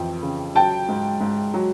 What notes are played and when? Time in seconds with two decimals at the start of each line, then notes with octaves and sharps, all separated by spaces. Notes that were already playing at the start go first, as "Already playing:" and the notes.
Already playing: F2 E3 G5
0.22 C#3
0.55 F#3 G5 A5
0.89 G#2
1.21 G#2
1.54 F#3